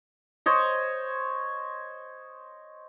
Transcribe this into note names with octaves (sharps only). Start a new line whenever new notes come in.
C5 C#5 D#5